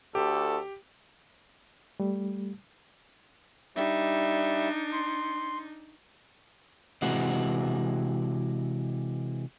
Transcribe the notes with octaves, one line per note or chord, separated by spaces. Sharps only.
D2 G4 A4
G3 A3
G3 D4 D#4 E5
C6
C3 E3 G#3 F#4